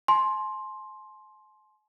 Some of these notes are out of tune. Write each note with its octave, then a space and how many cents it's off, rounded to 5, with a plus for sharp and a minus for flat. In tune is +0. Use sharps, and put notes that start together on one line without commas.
G#5 +45 C6 +10